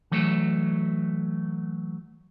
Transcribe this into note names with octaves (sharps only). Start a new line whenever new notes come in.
E3 F#3 A3